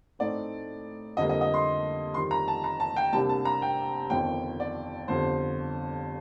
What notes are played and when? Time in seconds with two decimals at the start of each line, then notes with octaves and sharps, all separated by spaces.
0.19 A2 A3 C4 D#4 D5
1.17 F2 D3 G3 A#3 D#5
1.29 D#5
1.41 D#5
1.54 C6
2.14 F2 D#3 G3 C6
2.31 A#5
2.48 A5
2.64 A#5
2.80 A5
2.96 G5
3.13 C2 C3 G3 A#3 D4 A5
3.29 A5
3.45 A#5
3.62 G5
4.10 G1 F2 D#3 G5
4.60 D5
5.08 G1 F2 D3 G3 C5